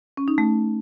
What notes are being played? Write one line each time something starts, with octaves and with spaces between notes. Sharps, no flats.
C#4
D#4
A3